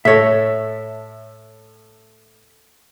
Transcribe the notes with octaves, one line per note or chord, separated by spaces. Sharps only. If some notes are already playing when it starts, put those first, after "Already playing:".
A2 A4 C#5 E5